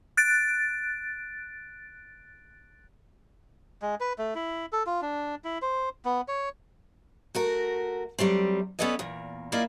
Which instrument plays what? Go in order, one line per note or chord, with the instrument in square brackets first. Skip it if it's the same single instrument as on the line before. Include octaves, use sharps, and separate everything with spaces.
[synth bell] F#6 A6 D7
[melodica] G#3
B4
A3
E4
A4
F4
D4
E4
C5
B3
C#5
[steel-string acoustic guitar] A3 F#4 A#4
F#3 G3 A3 C4
B3 C#4 A4 B4 D5 D#5
E2 A#2
A#3 E4 F4 D5 D#5